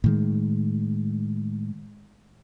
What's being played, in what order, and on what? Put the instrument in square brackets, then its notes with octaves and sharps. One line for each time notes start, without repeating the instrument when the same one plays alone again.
[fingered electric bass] A2 D#3 G#3